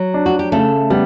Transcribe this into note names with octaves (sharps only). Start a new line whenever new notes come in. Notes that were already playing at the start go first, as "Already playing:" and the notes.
Already playing: F#3
D4
F#4
G4
C#3 A3 A4
G3 B3